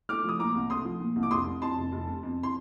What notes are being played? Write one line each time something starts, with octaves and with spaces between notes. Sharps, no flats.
A3 D6 F6
F3 D#6
A#2 A#5 D6
C2
A3 C6 D#6
F3
A#2
C2
D6
F1 C6 D#6
C3
F2 A5 C6
F1
F1
C3
F2
C6